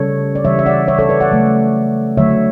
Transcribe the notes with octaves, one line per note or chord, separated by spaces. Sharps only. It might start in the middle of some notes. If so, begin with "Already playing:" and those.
Already playing: C#3 G3 A4 C#5
D5
C#3 E3 G3 C#5 E5
E5
D5 F#5
C#5 E5
A4 C#5
B4 D5
D5 F#5
C#3 F#3 A3
D3 F#3 A3 C#5 E5